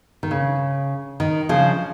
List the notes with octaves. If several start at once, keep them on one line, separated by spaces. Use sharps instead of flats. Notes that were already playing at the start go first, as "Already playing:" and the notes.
D#3
C#3
D#3
C#3 F3